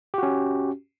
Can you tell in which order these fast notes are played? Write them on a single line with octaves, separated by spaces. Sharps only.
G4 F#4 C#4